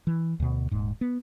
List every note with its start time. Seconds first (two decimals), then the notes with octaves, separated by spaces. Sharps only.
0.07 E3
0.40 D2 B2
0.71 D#1 G#2
1.01 B3